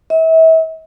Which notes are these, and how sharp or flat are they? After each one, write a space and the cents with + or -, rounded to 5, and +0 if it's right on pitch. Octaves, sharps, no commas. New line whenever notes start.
E5 -35